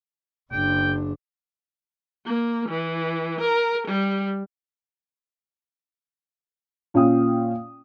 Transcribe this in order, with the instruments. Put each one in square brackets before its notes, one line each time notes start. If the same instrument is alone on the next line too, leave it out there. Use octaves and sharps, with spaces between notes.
[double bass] F#1 D4 [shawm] G5
[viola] A#3
E3
A#4
G3
[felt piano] A#2 C#4 F4 F5 G5 D#6